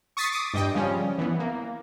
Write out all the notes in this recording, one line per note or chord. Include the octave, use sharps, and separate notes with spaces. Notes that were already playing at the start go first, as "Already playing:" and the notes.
C#6 D#6 A6 B6 C7
D6 D#6
G2 D#5 G5
C#3 F3 G3 C#4
E3 B3
A#3